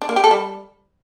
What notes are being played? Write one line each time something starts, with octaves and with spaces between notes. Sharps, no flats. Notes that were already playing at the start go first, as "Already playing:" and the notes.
D4
A#3
G4
A4
G3